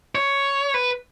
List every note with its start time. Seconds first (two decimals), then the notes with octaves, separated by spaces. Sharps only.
0.15 C#5
0.74 B4